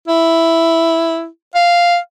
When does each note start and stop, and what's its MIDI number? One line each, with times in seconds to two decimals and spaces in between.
0.08 1.27 64
1.55 1.97 77